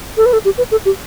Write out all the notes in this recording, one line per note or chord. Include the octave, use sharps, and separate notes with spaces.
A4
B4
A4
G4
B4
A4
G4